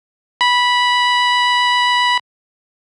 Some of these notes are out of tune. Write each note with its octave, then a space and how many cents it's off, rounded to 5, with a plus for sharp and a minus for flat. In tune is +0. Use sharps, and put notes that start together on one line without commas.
B5 -10